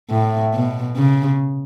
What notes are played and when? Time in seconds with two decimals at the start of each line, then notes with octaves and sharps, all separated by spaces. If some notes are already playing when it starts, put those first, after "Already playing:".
0.10 A2
0.53 B2
0.96 C#3